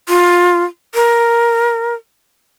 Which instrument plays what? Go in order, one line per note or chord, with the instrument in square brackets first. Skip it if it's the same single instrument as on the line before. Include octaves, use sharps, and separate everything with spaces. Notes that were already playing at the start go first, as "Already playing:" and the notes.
[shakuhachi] F4
A#4